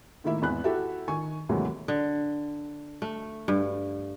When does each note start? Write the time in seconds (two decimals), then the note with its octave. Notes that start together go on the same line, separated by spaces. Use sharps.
0.24 A2 D#3 A#3 E4 E5
0.42 G#1 E2 B5 F#6
0.64 E4 F#4 G4 A4 E5
1.08 D#3 G#5 C#6
1.49 D#2 G#2 C3 E3 F#3 A3
1.88 D3
3.02 A3
3.48 G2